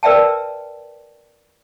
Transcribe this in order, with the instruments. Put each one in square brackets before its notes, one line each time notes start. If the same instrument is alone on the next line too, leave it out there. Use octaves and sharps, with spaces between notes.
[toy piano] A#4 B4 D5 E5 G5 A5